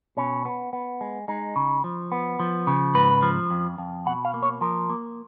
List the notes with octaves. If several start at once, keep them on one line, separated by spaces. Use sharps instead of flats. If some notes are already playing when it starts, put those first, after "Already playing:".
B2 C#4
B3
B3
G#3
G#3 D#4
C#3
F3
B3
F3
C#3
G#2 B4
F3
F2
F2
B2 F#5
F5
A#3
C#5
F3 A#4
A#3